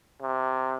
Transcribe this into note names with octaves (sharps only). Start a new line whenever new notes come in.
C3